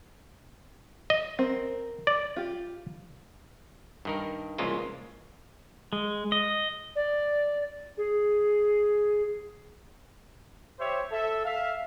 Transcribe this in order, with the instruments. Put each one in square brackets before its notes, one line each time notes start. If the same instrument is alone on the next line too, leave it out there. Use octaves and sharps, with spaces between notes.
[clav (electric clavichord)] D#5
[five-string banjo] C4 A#4
[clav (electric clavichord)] D5
[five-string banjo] F4 G4
[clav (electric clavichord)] G2 D#3 A#4
C2 C#3 E3 G#3 A#3 F4
[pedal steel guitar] G#3
D#5
[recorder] D5
G#4
[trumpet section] G4 C5 C#5 E5
A4 E5
E5 F5